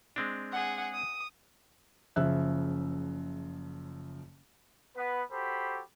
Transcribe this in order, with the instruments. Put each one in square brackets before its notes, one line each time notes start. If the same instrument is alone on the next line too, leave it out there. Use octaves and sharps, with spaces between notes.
[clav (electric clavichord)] G#3 C4 D4
[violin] G#4 F#5
D#6
[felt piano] F#1 C#3 F3 E5 E6 F#6
[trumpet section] B3 B4
F#4 G4 A4 C5 B5